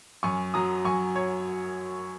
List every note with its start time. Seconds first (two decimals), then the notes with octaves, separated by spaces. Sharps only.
0.23 F#2 G#5 C#6
0.54 F#3 A#5 D#6
0.85 F#2 G#5 C#6
1.16 C#5